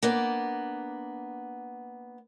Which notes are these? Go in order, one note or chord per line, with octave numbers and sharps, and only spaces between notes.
A#3 B3 D4